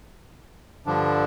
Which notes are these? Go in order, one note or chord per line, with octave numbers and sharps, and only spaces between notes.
G2 D3 F3 D4